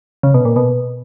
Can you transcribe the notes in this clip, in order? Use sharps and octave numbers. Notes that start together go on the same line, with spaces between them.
C#3
B2
A#2
B2